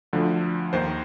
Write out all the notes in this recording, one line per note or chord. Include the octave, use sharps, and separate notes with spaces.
D2 D3 F3
D#2 D#3 C5